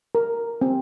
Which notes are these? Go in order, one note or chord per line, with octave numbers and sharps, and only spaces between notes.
A#4
C4